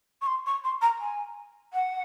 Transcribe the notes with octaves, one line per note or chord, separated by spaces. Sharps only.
C#6
C6
C#6
C6
A#5
G#5
F#5